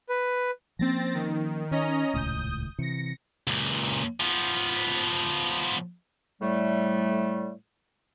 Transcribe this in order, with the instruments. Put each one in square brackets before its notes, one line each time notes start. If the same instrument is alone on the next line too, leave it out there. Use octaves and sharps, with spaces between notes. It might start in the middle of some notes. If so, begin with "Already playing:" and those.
[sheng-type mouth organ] B4
[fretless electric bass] F3 A#3 C#4 [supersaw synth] C4 A6 A#6
[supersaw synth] D#3
[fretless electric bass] D#3 [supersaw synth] C#4 D#5 A#5
[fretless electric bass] D#1 C#2 A2 [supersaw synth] D#6 G6
[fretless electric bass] C3 E3 [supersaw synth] A#6 C#7
[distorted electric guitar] C#2 A#2
F3 B3
[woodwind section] A2 G3 A3